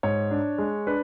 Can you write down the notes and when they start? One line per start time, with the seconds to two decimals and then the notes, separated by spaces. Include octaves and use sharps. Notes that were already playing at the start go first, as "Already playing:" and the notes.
0.03 G#2 C#5
0.31 D4
0.58 G#3
0.87 D4 B4